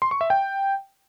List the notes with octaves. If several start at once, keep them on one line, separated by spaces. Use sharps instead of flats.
C6
C#6
E5
G5